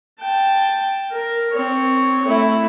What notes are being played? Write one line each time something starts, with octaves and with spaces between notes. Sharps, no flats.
G5 A5
A#4
C4 C#5
A3 E4